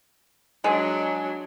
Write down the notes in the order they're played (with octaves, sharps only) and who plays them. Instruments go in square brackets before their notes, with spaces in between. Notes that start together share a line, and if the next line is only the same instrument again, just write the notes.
[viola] F#3 D4 [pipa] G#3